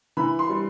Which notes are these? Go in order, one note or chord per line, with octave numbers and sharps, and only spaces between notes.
E3 B5
C6
G3